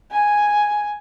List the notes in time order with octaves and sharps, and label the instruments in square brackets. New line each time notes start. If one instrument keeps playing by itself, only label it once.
[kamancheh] G#5